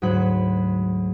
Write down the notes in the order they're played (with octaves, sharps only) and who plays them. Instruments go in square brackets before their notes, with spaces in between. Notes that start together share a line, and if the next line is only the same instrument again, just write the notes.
[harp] D2 G#2 F#3 F#4 B5 F#6